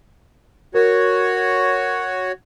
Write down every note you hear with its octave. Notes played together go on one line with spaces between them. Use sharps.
F#4 A#4 C#5